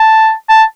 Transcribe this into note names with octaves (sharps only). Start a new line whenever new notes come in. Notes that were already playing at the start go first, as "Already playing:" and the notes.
Already playing: A5
A5